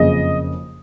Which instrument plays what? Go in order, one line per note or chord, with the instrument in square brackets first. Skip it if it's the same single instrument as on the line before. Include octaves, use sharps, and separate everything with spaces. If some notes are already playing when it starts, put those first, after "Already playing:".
Already playing: [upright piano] F#1 F2 C#3 F3 D#5